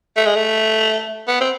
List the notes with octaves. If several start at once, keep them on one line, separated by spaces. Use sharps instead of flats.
A3
G#3
A3
B3
C4